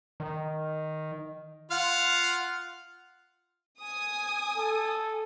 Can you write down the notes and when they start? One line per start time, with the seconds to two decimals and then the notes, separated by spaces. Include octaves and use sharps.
0.20 D#3
1.71 F4 F5 F#5
3.81 G#5 D#6
4.57 A4